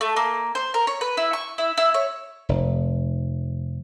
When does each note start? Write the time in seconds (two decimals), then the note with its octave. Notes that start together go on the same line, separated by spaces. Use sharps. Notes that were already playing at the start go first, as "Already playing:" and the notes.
0.01 A3
0.16 A#3
0.55 C5
0.74 A#4
0.87 C#5
1.01 B4
1.17 E4
1.33 C#6
1.58 E4
1.77 E4
1.94 C#5
2.49 F1